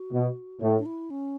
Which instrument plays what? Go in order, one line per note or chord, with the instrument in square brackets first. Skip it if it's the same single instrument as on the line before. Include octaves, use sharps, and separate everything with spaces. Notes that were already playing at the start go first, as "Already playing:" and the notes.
Already playing: [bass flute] F#4
[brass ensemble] B2
A2
[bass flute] D4
E4
C#4